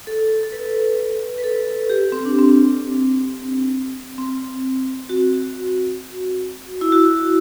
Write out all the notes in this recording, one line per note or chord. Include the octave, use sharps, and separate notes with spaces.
A4
A4
B4
B4
A4
G4
C4
D4
C4
C4
F#4
E4
F#4